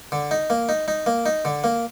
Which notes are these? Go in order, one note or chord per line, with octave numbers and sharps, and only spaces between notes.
D3
D#4
A#3
D#4
D#4
A#3
D#4
D3
A#3